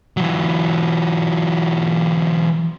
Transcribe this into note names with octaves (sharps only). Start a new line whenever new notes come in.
E3 F#3